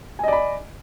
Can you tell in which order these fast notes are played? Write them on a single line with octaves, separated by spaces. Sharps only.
G#5 D#5 D5 B5